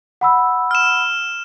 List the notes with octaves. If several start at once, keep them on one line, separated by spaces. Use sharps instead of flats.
F#5 B5 E6
F6 E7